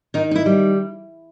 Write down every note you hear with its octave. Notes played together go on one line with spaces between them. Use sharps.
D#3 D#4
D#4
E4
G3